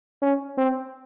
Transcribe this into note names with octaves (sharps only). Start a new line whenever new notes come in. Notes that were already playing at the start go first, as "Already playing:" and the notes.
C#4
C4